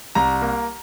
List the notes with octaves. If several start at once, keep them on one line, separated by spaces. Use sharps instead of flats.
C2 A#5
A#3